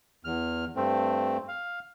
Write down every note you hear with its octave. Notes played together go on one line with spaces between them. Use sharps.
E2 F6
G2 A3 C4
F5